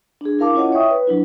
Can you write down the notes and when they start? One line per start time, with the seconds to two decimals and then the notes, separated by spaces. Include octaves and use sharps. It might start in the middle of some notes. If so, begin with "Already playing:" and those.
0.21 D4 G#4
0.39 E4 A#4 F5 A5 D6
0.54 C#4 E4 F4 C#5 D#5 F#5
0.72 C#5 D#5 E5 G5 C#6 D#6
0.91 B4
1.07 F#3 D4 E4